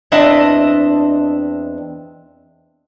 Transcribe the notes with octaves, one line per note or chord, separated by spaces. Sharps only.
E2 C4 D4 D#5 E5 A5